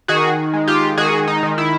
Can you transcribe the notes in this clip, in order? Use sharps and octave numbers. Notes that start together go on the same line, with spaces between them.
D#3 F#4 G#4
G#3
F4 G4
D#3 F#4 G#4
D#4
D#3
E4